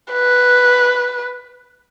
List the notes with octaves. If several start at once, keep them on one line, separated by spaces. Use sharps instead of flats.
B4